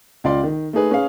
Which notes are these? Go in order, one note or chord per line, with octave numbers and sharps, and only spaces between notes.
C#2 F4 D5 C6
D#3
A3 D#4 G#4 B4
C#4 G#4 B4 F5